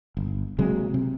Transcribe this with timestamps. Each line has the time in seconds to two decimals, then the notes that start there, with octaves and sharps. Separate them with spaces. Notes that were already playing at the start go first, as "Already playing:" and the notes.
0.17 G1
0.59 C3 F#3 G#3 A#3
0.94 C3